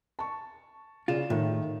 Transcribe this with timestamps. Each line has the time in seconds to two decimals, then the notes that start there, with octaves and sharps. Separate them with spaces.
0.19 A5 C#6
1.08 C#3 F4 D5 E7
1.30 A2 D#3 A3